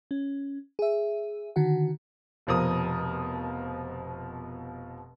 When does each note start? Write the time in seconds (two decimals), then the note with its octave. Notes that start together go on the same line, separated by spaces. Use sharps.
0.11 C#4
0.79 G#4 E5
1.56 D3 D#3 F#4 F#5
2.47 F1 B2 F3 A#4 D#6